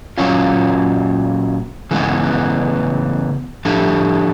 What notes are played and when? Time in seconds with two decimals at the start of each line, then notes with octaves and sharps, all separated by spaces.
0.18 A#2 F#3 A#3 C#4 F4
1.91 C#3 E3 G#3 B3
3.65 A2 F3 A3 D4 G4